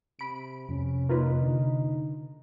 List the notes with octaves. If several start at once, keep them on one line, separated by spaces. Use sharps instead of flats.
C3 B5 D7
F2 C3 C#4
A#3 D#4 F4 B4
D3